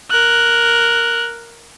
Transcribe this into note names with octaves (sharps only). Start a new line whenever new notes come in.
A#4 F#6